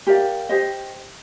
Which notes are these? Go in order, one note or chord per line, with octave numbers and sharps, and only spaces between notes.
G4 A#4 D5 F5
G4 C5 D#5